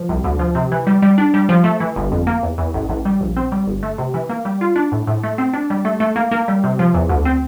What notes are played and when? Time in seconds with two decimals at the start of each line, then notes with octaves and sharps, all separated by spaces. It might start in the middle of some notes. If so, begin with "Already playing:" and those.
Already playing: F3
0.09 C2
0.24 D2
0.39 F3
0.55 C3
0.72 E3
0.87 G3
1.02 G3
1.18 D4
1.34 G3
1.49 F3
1.64 A3
1.80 E3
1.96 G1
2.12 F2
2.27 A#3
2.43 E2
2.58 E2
2.74 A1
2.89 A1
3.05 G3
3.21 A#1
3.37 C4
3.52 G3
3.67 G1
3.83 A3
3.98 C3
4.14 E3
4.29 A#3
4.45 G3
4.61 F4
4.76 D4
4.92 A2
5.07 A2
5.23 A3
5.38 C4
5.53 D4
5.70 G3
5.85 A3
6.00 A3
6.16 A#3
6.31 A#3
6.48 G3
6.64 C3
6.79 F3
6.94 E2
7.09 D2
7.25 C4